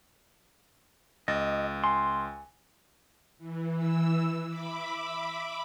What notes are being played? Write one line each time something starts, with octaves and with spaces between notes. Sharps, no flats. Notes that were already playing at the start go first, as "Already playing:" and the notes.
C#2 D#5 A6
G#5 C6
E3
E3 E6
E5 B5 D6